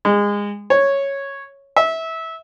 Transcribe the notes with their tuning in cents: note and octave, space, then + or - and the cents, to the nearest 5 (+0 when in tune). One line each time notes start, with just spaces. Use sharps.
G#3 -25
C#5 -5
E5 -20